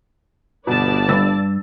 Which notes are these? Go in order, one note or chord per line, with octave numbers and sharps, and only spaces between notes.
G1 B2 B4 D5 A5
C2 G2 E6 A6